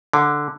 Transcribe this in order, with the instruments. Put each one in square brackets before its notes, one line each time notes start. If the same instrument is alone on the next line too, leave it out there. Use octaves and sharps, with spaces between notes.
[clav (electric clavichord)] D3